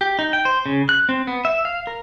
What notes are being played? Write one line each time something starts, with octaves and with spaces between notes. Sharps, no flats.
G4
D#4
G5
C5
C#3
F#6
C4
B3
E5
F5
A#4